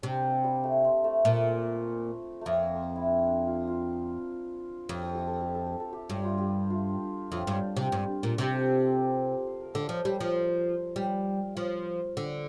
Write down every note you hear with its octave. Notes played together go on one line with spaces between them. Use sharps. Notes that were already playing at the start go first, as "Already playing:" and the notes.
C3 D4
A#3
G3
A3
C4
A3
A#2 A3
F2 A3 A#3
C4
E4
D4
D4
F4
F4
F2 G4
A4
G4
A4
G4
A4
G4
A4
G4
G2 G4
F4
G4
F4
F2 F4
G2
C3
G2
A#2
C3
A4
C5
A#4
D3 A4
F3 A#4
G3 C5
F3 C5
G3 A#4
F3
D3